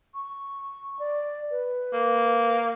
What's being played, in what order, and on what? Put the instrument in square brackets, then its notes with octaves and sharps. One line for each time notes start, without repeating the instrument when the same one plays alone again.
[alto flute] C#6
D5
B4
[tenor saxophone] A#3